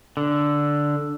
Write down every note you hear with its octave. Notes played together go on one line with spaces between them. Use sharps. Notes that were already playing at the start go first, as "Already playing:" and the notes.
D3